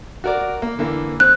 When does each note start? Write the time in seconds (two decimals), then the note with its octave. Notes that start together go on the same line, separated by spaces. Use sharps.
0.24 F#4 A#4 D5
0.62 A#3
0.79 D3 E3 A#3
1.20 C4 F#6